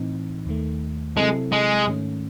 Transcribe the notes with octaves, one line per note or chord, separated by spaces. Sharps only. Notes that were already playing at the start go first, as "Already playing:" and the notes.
Already playing: A2 E3 C4 D#4
D#2 D#3 A3
C3 F#3 G#3 C4 E4 A4
G#3
G#2 D#3 A3 C#4